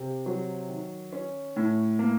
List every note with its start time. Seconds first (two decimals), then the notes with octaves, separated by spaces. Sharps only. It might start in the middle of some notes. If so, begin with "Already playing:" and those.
Already playing: C3
0.26 F#3
0.69 D#3
1.12 C#4
1.56 A2
1.99 A#3